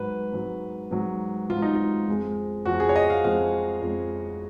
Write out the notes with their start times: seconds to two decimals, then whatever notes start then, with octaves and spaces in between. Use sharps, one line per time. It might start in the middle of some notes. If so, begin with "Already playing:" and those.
Already playing: G#2 F#3 B4
0.33 G#2 F#3
0.91 G#2 F#3
1.50 G#2 F#3 F4
1.62 D#4
1.75 F4
2.08 F2 F3 G#3
2.65 F2 F3 G#3 F#4
2.80 G#4
2.89 C#5
2.96 D#5
3.10 F5
3.24 F2 F3 G#3 F5
3.82 F2 F3 G#3